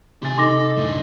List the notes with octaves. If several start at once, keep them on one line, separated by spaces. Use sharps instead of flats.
C3 G4 G#5 C6 A6
D#4 A4 C6 D6 A#6
C2 F#2 A2 D3